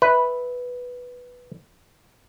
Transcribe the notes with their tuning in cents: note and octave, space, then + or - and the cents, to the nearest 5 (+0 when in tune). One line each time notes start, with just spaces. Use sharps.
B4 +0 E5 -20